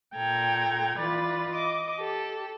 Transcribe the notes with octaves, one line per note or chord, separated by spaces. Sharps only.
A#2 A4 G5 A#5 G#6
E3 F4 B4 D5 B5 A6
D#5 D6
G4 A4